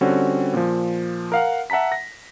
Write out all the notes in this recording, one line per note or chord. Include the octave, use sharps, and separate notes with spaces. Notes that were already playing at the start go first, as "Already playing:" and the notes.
D3 G3 C4 C#4 F#4
A#2 F3
A#4 F5 F#5
E5 F#5 A5 A#5 B6
A#6